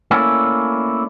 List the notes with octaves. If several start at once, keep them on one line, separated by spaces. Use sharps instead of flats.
A3 A#3 C#4 D4 E4